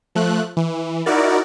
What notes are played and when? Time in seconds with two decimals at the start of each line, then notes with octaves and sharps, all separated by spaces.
0.15 F3 A3 F#6
0.57 E3
1.06 D#4 E4 F#4 A#4 D5